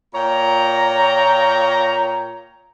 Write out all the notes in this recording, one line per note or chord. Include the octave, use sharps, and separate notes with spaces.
A#2 C#5 G5 A#5